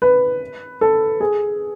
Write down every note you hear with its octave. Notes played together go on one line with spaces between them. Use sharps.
B4
A4
G#4